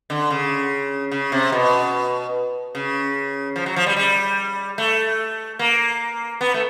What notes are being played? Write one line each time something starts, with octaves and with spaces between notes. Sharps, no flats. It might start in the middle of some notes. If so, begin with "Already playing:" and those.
D3
C#3
C#3
C3
B2
C#3
F3
F#3
F3
G3
G3
A3
A#3
B3
A3